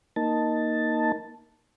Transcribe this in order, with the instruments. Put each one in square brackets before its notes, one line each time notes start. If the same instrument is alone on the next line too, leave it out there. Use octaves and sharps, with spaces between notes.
[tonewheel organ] A#3 D#4 A5